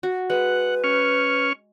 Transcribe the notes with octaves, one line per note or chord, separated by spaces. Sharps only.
F#4
G#3 B4 F#5
C#4 C#6 F6